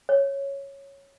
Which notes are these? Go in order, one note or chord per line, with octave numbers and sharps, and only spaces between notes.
C#5